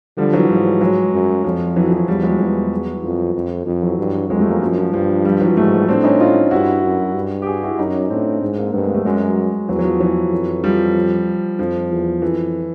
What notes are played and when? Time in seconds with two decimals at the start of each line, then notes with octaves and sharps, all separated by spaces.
0.17 D3 F3 G3
0.33 E3 F#3
0.50 G#2 F3 G3
0.80 F#3 G#3
1.12 F#2
1.44 F2 F3
1.76 E3 F#3
1.86 F3
1.92 E3 F#3
2.07 E2 F3 G3
2.23 F#3 G#3
2.39 E2 E3 F#3
3.03 F2 F3
3.34 F2
3.66 F2 F3
3.82 E3 F#3
3.98 G2
4.30 F2 F#3 G#3
4.40 G3 A3
4.50 G#3 A#3
4.61 F#2 F3
4.78 F3
4.93 G2 F3
5.25 F3 G3
5.40 E3 F#3
5.56 G#2 G3 A3
5.88 A2 C4 D4
6.03 C#4 D#4
6.20 D#4 F4
6.51 G2 E4 F#4
6.83 F#2
7.14 G2
7.42 G4
7.46 F#4 G#4
7.63 E4 F#4
7.78 F#2 C#4 D#4
8.10 A2 C4 D4
8.42 G#2
8.58 A#3 C4
8.73 G2 A3 B3
8.84 G#3 A#3
8.94 G3 A3
9.05 F#2 F#3 G#3
9.69 E2 E3 F#3
9.79 F#3
9.84 F3
10.00 E3 F#3
10.32 F2
10.64 F3 G3
11.59 F2 F3
11.91 E2
12.22 F2 E3